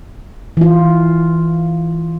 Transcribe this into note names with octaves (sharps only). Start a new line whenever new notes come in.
E3 F4